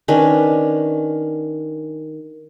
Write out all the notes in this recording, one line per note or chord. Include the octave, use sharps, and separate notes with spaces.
D#3 C#4 D4 B4